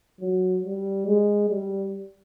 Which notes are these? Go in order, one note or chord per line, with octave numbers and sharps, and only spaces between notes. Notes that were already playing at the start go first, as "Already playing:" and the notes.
F#3
G3
G#3
G3